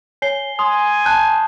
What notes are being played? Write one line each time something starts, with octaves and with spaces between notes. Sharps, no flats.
C#5 G#5 C7 G7
G#5 C6 D#6
A5 F#6 G6